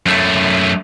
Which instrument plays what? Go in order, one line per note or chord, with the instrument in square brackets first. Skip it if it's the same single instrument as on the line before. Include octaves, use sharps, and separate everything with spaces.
[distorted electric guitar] F#2 A3